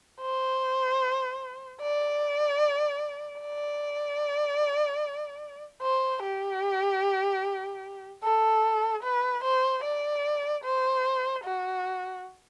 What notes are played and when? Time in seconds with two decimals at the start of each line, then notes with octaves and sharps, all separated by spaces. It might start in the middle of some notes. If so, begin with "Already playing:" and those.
0.21 C5
1.82 D5
3.42 D5
5.82 C5
6.23 G4
8.23 A4
9.04 B4
9.44 C5
9.84 D5
10.64 C5
11.44 F#4